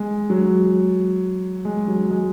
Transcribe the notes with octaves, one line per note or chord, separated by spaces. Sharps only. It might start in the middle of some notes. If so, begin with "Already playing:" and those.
Already playing: G#3
F#3
G#3
F#3
G#3